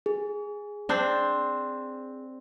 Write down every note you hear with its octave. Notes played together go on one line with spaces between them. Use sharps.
G#4
C4 D4 C5